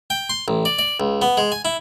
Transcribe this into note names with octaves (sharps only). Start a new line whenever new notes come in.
G5
C6
A1
D5
D5
C#2
B3
G#3
G#5
E4